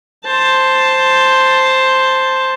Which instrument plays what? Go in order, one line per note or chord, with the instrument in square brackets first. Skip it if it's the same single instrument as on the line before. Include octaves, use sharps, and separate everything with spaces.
[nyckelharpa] C5 A5